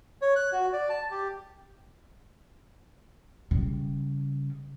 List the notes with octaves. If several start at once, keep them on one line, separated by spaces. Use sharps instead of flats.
C#5
F#6
F#4
D5
A5
G4
C#3 G3